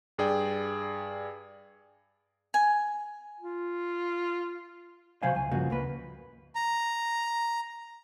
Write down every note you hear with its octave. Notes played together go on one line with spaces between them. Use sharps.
G2 G#4 D5 G5
G#5
F4
C3 F#3 C5 F5 G#5
C#2 G#5
G2 C#3 F3 A#3 F#4
C#2 A#3 B4
A#5